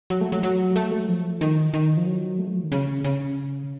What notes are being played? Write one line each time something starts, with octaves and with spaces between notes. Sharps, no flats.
F#3
A3
F#3
F#3
A3
F#3
F3
D#3
D#3
F3
F#3
A3
F#3
F3
D#3
C#3
C#3